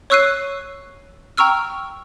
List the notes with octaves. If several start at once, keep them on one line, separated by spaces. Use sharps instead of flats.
C#5 C#6 E6 F#6 C7 D#7
G5 A#5 C#6 E6 F6